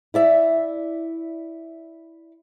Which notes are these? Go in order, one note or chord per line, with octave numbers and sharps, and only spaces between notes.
E4 D5 E5